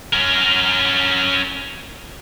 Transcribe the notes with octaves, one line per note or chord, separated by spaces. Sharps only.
C#4 A#4